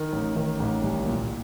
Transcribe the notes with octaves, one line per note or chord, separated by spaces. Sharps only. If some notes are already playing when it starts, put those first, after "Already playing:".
Already playing: D#3
A1
D#3
A1
C2
A#2